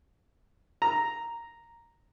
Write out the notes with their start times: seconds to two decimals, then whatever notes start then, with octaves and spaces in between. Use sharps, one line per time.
0.82 A#5